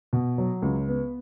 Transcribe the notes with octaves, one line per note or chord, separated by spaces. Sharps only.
B2
F#3
C#2
B3